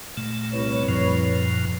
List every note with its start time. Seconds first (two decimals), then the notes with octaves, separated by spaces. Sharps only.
0.17 A#2 A3
0.52 C2 B4 C#5
0.89 F#2 A#2 F3